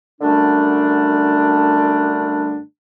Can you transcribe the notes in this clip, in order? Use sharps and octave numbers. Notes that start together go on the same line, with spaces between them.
F#2 D3 G3 A3 D4